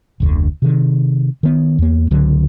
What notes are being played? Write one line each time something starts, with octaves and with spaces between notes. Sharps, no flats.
F1 D2 D3
C3 D#3
D#3 B3
E2 A#3
C#2 D3 F#3